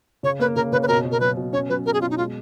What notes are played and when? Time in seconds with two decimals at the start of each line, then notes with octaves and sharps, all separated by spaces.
0.23 C#3 C#5
0.40 A#3 B4
0.56 C#3 A#4
0.72 C#3 B4
0.83 B4
0.88 B2 A#4
1.05 B2
1.11 A#4
1.20 F#3 B4
1.37 B2
1.53 C#4 C#5
1.69 F#3 B4
1.86 F#4 A#4
1.94 G#4
2.01 B2 F4
2.11 D#4
2.17 G#3 F4